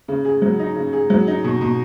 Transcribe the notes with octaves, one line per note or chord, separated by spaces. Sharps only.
C#3
G#4
F#3
D#4
C#3
G#4
F#3
D#4
B2
B2